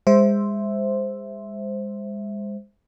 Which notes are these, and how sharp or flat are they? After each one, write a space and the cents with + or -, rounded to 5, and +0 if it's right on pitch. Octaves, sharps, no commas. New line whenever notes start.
G#3 -30 C5 +0 E5 +0